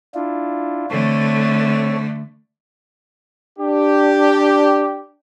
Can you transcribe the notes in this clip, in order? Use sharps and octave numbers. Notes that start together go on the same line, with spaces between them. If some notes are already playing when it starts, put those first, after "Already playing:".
D4 E4 F4
D3 A3 C4 A4 C#5
D4 G4